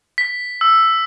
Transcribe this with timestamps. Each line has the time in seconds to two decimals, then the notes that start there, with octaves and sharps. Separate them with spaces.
0.18 B6
0.61 E6